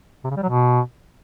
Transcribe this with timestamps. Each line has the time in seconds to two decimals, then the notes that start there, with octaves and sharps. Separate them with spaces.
0.24 C3
0.30 C#3
0.37 G3
0.43 F#3
0.49 B2